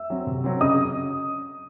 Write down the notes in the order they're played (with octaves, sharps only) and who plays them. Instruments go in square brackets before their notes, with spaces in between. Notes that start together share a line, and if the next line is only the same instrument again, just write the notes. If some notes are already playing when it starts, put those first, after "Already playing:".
Already playing: [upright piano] E5 E6
F#3 C4
C3
F#3 C4
C#3 D#5 D#6